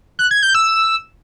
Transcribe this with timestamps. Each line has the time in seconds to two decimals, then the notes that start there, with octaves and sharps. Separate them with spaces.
0.19 F#6
0.31 G#6
0.43 G6
0.55 E6